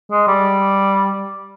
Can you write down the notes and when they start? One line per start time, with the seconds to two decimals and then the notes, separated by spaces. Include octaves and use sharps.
0.11 G#3
0.27 G3